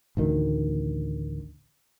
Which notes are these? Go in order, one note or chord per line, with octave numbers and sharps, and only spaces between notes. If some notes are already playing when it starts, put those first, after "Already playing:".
A1 D2 D#3